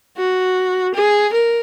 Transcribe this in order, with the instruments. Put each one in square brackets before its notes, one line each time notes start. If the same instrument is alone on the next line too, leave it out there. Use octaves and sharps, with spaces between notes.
[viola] F#4
G#4
A#4